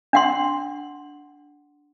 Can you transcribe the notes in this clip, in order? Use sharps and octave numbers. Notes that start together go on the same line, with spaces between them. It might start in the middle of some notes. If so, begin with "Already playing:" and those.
D4 F#5 C6